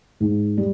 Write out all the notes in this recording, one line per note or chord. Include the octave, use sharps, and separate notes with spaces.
G#2
G3